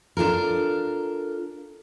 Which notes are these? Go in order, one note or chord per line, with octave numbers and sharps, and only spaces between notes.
D4 F4 A4 A#4